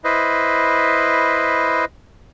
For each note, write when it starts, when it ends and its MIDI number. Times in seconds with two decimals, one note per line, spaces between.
0.04 1.85 64
0.04 1.85 71
0.04 1.85 72
0.04 1.85 75